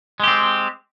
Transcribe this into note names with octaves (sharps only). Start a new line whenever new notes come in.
G#3 C4 G4